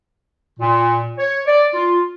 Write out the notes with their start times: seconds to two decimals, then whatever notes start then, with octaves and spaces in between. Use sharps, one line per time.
0.60 A#2
1.18 C#5
1.47 D5
1.73 F4